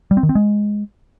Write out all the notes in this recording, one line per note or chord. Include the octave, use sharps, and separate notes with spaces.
G3
C4
D#3
C4
G#3